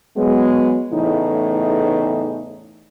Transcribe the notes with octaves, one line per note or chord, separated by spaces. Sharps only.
F#3 G#3 B3
E2 A2 C#3 E3 A3 D#4